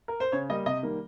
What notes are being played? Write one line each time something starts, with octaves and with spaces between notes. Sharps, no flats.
A#4
C5
C#3 C#5
G3 A#3 D#5
C3 D#5
D#3 G3 A#3